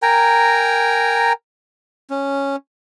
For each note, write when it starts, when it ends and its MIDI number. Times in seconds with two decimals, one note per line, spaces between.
0.02 1.33 70
0.02 1.33 79
0.02 1.33 80
0.02 1.33 82
2.10 2.56 61